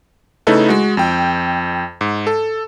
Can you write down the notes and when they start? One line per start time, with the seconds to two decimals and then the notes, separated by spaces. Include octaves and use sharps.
0.47 C#3 A3 D#4 E4 A4 B4
0.69 G#3 F#4
0.97 F2 G5
2.01 G#2
2.27 A4